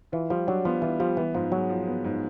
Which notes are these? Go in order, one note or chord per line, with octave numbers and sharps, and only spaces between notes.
E3 F4
F3 G3
F#3 D4
F3 B3
E3 F4
F3 G3
E3 B3
G#2 F3
F#3 G#3
F3
B3
G#2